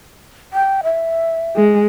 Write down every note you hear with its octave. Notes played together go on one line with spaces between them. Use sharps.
G5
E5
G#3